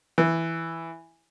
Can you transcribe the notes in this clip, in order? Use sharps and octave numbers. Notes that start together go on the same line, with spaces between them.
E3